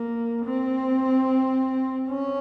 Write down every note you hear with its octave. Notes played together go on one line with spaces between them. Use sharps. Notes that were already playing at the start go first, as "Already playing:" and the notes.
Already playing: A#3
C4
C#4